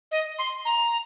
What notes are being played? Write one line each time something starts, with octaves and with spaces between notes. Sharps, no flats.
D#5
C6
A#5